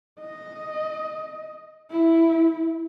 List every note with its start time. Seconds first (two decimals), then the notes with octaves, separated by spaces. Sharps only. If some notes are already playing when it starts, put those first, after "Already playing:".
0.20 D#5
1.91 E4